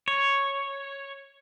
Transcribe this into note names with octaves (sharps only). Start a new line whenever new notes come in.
C#5